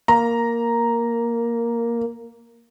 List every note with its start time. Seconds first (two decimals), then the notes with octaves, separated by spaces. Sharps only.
0.08 A#3 A#5